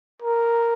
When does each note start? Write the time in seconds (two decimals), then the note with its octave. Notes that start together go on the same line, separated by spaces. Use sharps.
0.22 A#4